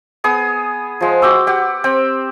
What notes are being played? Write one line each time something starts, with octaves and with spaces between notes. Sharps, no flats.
B3 G#4 D#6
F3 G#3
F#4 G5 D6 E6
G4 F#5
C4 G5